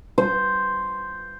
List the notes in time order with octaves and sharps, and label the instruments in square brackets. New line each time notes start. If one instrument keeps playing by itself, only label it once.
[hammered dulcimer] C5